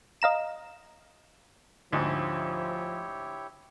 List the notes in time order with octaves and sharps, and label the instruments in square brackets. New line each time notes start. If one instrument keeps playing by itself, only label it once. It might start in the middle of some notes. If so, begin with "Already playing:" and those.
[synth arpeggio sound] D#5 F5 A#5 E7
[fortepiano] D2 G#2 [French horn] F3 [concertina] E4 G4 C#5